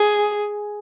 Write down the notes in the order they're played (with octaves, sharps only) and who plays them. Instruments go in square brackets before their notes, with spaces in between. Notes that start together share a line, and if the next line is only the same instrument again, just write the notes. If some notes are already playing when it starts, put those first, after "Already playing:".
Already playing: [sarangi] G#4